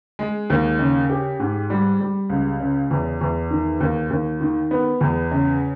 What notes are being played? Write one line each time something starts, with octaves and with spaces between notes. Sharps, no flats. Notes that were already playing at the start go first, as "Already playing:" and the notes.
G#3
D#2
C#3
G4
G#2
G3
G3
C#2
C#3
E2
E2
D#3
D#2
D#2
D#3
B3
E2
C#3